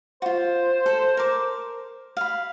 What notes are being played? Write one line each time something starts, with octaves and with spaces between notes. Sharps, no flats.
F4 F#4 C5
A4
A#4 D6
F5 B5